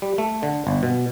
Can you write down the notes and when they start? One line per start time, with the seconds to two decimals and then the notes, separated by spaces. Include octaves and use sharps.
0.02 G3
0.18 A3
0.43 D3
0.67 G1
0.83 B2